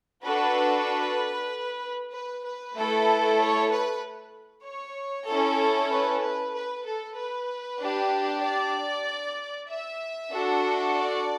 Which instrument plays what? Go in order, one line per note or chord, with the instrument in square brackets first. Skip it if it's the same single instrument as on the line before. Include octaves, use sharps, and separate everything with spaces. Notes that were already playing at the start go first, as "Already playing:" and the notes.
[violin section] D4 F#4 A4 B4
B4
B4
A3 E4 A4
C#5
B4
C#5
C#4 E4 A4
B4
B4
B4
A4
B4
D4 G4
D5
E5
D4 F#4 A4
D5